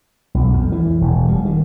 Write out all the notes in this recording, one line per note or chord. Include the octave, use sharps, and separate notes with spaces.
B1
F2
E3
E1
G3
D#3